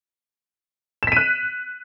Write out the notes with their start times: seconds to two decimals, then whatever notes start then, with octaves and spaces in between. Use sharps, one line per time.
1.03 E7
1.07 B6
1.12 D#7
1.17 F#6